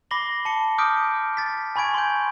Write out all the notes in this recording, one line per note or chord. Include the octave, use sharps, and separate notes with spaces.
B5 D6 A#6 C7 F#7 G7
A5 C#7
D6 D#6 F6 G6 B6 D7
A6 B6
G#5 B5 C#6 G#6 D7
C6 G6